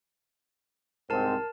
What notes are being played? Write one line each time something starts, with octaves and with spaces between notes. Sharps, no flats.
C2 G#2 C4 A#4 A5